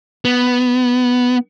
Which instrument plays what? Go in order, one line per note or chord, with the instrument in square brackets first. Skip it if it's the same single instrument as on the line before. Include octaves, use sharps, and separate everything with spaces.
[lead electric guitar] B3